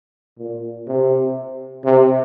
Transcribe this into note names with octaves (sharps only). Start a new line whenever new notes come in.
A#2
C3
C3